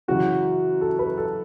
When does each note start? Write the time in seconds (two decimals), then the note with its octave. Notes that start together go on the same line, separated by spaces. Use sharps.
0.08 F#2 C#3 E3 F#4
0.81 A4
0.99 B4
1.18 A4